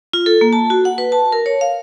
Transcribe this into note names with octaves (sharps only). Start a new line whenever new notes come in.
F4
A4
A#3
A5
F#4
F#5
B4
A5
A#4
C#5
F5